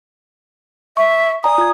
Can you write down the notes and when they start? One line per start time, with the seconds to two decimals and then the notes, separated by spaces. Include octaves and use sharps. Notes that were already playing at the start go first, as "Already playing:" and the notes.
0.97 E5 C#6
1.44 D5 G#5 A#5 D#6
1.58 F4 A#5 G#6